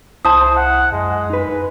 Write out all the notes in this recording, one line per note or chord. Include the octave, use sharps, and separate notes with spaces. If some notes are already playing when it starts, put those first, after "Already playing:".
C2 E4 C5 A5 D#6
F#5
F#2 G#3
D#4 B4